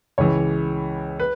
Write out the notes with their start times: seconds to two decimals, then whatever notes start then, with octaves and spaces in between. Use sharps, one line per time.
0.18 C#2 C#3 E3 C#5
1.20 B4